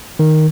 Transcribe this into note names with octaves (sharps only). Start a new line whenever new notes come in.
D#3